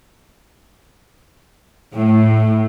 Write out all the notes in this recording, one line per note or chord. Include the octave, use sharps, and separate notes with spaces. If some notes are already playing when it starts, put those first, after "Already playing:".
A2